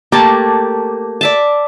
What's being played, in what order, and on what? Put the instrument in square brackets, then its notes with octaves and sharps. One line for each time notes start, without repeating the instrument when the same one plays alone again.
[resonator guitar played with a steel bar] A3 A#3 [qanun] G4 A5
[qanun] D5 E5 A5